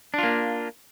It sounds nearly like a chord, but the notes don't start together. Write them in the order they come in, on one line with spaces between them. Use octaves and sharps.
D4 F4 A#3